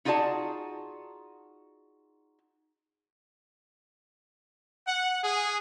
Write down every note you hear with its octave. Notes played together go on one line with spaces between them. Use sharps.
D#4 F4 F#4 G#4 D5 A5
F#5
G#4